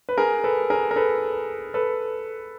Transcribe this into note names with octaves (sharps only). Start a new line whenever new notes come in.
B4
G#4 A#4
A4 B4
G#4 A#4
A#4
A4 B4
A4 B4